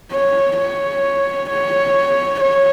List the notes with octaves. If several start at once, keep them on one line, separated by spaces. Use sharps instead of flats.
C#5
C#5
C#5
C#5